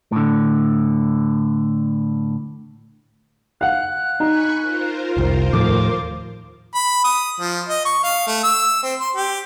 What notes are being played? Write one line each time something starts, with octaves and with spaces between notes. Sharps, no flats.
A2 D3
F5 F#5 F#6
D#4 G#5 A#5 B5 C#6
F4 A#4 C5
F1 C2
D#2 A2 F3 D6
B5
D#6
F3
D#5
C#6
F5
A3
E6
C4
C6
G4